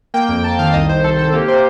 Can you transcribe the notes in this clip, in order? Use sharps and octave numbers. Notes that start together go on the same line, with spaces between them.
A#3 G5
F2
F2 A5
D#3 F5
C2 D#5
C2 C5
C2 A4
C2 A4
A#3 G4
A#3 C5